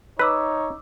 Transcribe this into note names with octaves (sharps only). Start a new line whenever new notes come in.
D#4 B4 C#5 D6 E6 B6